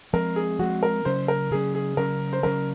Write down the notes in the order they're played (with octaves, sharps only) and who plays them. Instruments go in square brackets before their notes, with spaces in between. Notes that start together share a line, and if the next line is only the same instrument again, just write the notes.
[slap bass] F3 G#3 C4 [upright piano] A#4
[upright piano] G#4
[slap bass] F3 G#3 C4 [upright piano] F#4
[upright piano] A#4
[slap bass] C#3 F#3 C#4 [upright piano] C5
[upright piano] A#4
[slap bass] C#3 F#3 C#4 [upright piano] G#4
[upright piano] G#4
[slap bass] C#3 F#3 C#4 [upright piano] A#4
[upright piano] C5
[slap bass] C#3 F#3 C#4 [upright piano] A#4